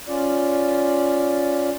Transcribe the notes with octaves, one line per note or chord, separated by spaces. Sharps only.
C#4 F4 D5